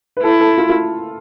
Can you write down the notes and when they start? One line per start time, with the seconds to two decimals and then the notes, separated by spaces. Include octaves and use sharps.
0.17 B4
0.23 E4 A4
0.41 A4
0.58 F4
0.69 F4